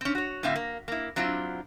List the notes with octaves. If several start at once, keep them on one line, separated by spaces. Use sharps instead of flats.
C4 C#4
F#4 C#5
A2 D3 C4 E5 F5
A#3
A#3 E4
F#3 C4 D4 E4 F4